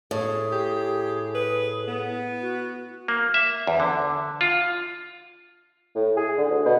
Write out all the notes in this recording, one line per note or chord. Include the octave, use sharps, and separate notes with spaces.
A2 G#4
G4
B4
B3
F#4
A#3
E5
E2
D3
F4
A2
G#4
D3
D2
B2